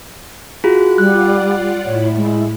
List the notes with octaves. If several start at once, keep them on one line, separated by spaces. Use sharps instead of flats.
F4 F#4 G#4 F#6
G3 F4 D5 F#5 F#6
A2 E4 C#5
G#3